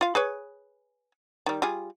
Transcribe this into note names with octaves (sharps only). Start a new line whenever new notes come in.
F4 F5
G#4 B4 C#5
D#3 G3
G3 F4 G#4